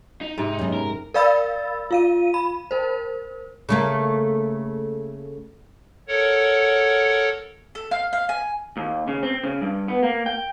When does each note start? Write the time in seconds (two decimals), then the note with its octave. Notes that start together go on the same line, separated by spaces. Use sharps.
0.21 D#4
0.38 G#2 C3
0.59 F#2 B3
0.73 A#4
1.14 A#4 D5 F5 B5 E6 A6
1.91 F4 F5 D#7
2.34 B5
2.71 A#4 C5
3.69 C#3 A3 A#3
6.08 A4 A#4 C#5 F#5
7.75 A4
7.91 F5
8.13 F5
8.29 G#5
8.77 D#2
9.08 C#3
9.23 C4
9.44 C#3
9.61 G2
9.88 B3
10.03 A#3
10.26 G5